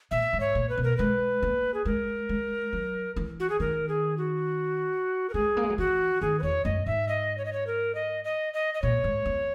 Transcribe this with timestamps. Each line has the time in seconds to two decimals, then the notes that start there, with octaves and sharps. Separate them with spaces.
0.11 A#2 E5
0.33 G#2
0.40 C#5
0.55 A#2
0.69 B4
0.77 B2
0.84 A#4
0.97 G#3 B4
1.42 A#3
1.74 G#4
1.85 G#3 A#4
2.29 G#3
2.73 F#3
3.16 E3
3.40 F#4
3.50 G#4
3.60 D#3 A#4
3.89 G#4
4.17 F#4
5.30 A#4
5.34 G#3 G#4
5.57 A#3
5.63 G#3
5.70 F#3
5.78 E3 F#4
6.22 D#3 G#4
6.39 B4
6.43 E2 C#5
6.65 F#2 D#5
6.86 G#2 E5
7.09 D#5
7.38 C#5
7.45 D#5
7.53 C#5
7.67 A#4
7.95 D#5
8.24 D#5
8.54 D#5
8.74 D#5
8.82 A#2 C#5
9.04 G#2
9.25 E2